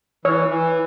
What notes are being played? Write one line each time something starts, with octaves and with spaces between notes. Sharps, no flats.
E3 C#5
E3